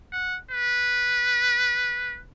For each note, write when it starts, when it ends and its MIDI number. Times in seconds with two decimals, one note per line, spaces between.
0.12 0.37 78
0.51 2.20 71